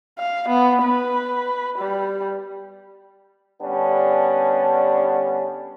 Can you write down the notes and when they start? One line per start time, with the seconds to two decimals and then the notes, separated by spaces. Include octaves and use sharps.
0.19 F5
0.48 B3
0.83 B4
1.78 G3
3.62 D3 G3 B3 C#4 D4